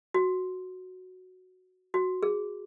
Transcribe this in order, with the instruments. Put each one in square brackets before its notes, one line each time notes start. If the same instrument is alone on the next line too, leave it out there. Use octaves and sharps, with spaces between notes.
[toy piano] F#4
F#4
G#4